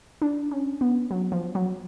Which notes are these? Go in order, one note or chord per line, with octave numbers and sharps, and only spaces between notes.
D4
C#4
B3
F#3
F3
F#3